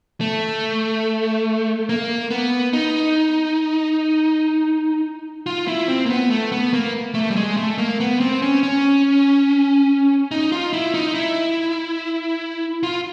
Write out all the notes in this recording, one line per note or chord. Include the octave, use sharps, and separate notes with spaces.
A3
A#3
B3
D#4
F4
E4
C4
A#3
B3
A3
B3
A#3
A3
G3
G#3
A3
A#3
B3
C4
C#4
C#4
D#4
F4
E4
D#4
E4
F4